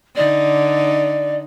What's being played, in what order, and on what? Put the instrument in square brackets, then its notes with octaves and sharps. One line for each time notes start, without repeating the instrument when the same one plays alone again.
[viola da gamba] D3 D#4 [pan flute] D5